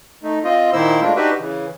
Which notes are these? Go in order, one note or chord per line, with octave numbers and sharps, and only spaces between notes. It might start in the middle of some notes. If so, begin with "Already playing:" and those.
A3 D#4
C4 F4 D#5
A#2 D#3 A#3 E4 C5 E6
G#3 A3 D4 F4
D4 D#4 F#4 G4 B4 E5
C#3 E3